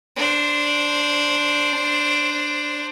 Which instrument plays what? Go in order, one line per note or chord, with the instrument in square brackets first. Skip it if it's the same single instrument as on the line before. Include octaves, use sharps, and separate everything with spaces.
[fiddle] D4 C5